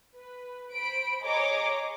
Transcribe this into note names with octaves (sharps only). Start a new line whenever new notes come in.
B4
C5 B5 D7
G#4 C#5 D#5 A#5 D6